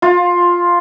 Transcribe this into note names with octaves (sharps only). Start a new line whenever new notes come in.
F4